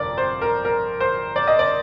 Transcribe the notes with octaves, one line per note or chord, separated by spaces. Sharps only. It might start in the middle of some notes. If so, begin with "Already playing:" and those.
Already playing: G1 F2 C3 A#4 D5
C5
A#4
A#4
C5
D5
D#5
D5